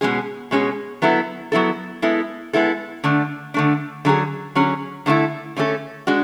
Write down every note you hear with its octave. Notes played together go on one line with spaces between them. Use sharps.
B2 G#3 C#4 G#4
B2 G#3 C#4 G#4
F#3 B3 E4 A4
F#3 B3 E4 A4
G#3 B3 E4 A4
G#3 B3 E4 A4
D3 A3 D4
D3 A3 D4
D3 F#3 C#4 G#4
D3 F#3 C#4 G#4
D3 A3 C#4 E4 A4
D3 A3 C#4 E4 A4
G#3 D4 F#4